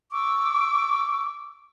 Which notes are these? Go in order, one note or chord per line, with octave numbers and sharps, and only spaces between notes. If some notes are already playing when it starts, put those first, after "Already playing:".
C#6 D6 E6